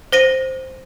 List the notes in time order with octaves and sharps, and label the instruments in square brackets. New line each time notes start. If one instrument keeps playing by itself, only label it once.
[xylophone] C5 A#6 D#7